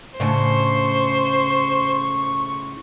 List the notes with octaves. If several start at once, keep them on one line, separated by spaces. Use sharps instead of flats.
A2 C#3 D4 C5 C#6